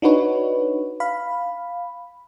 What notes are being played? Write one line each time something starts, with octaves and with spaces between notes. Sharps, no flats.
D4 D#4 F#4 B4 C#5
F5 B5